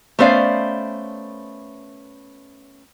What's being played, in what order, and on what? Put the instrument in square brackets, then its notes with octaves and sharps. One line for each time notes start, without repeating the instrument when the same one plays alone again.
[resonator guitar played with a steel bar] A3 B3 C#4 C5 D5 F5